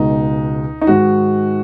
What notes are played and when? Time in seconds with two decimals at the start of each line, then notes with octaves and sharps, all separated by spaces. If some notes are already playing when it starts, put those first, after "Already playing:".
Already playing: C#2 B2 G#3 D#4
0.81 D#4
0.87 G#2 D#3 G#3 F#4